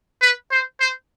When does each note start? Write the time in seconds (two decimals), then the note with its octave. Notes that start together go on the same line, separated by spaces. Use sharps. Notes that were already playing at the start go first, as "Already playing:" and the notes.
0.22 B4
0.51 C5
0.80 C5